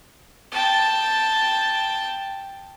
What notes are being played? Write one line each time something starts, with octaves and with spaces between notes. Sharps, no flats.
G5 A5